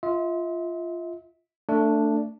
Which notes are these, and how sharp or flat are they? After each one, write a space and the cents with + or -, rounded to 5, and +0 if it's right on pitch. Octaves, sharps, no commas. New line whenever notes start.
F4 -10 E5 -45
A3 +20 D4 +0